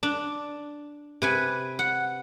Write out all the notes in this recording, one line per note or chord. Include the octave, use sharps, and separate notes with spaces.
D4
C3 B4 G#5
F#5